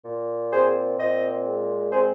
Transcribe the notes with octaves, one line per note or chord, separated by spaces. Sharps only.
A#2
C4 G#4 C5
A#2 C5 D#5
G#3
C4 G#4 C5